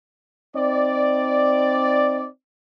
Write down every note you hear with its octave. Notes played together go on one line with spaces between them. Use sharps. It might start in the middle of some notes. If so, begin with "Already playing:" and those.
C4 D#4 D5